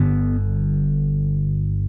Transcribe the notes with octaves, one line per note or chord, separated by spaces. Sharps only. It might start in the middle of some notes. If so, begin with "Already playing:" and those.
Already playing: G1 G2 D3 B3